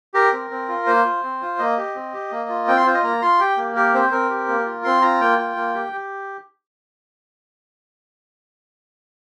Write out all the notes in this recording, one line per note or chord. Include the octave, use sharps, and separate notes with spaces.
G4 A#4
C4
C4
F4
A#3 C5
F4
C4
F4
A#3 D#5
G4
C4
G4
A#3
F4
C4 G5
C6
F4 C5
D#5
A#3 A#5
F4 C6
G4 G5
A#3
G4 A#4
C4 C5
C4 A#4
G4
A#3
F4
C4 C6
F4 A#5
A#3 G5
F4
A#3
G4
G4